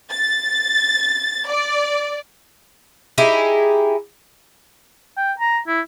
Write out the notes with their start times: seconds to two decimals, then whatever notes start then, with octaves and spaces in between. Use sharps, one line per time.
0.11 A6
1.49 D5
3.18 D#4 E4 G4 G#4
5.17 G5
5.40 A#5
5.67 E4